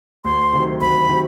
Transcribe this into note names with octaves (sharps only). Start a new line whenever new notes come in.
D2 C6
C3 D#3 F#3
D2 B5
C3 D#3 F#3